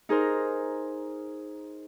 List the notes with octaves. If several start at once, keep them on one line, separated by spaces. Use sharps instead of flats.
D#4 G#4 A#4 C5